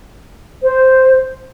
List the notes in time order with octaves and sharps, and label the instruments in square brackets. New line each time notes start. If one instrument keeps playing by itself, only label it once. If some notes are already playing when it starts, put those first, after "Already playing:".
[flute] C5